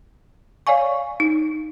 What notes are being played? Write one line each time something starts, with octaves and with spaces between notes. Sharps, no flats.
C#5 D5 F5 G#5 C#6
D#4